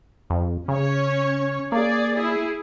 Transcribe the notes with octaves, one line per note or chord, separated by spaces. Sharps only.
F2
C#3 C#4 C#5
A#3 G#4 D5
E4 G#4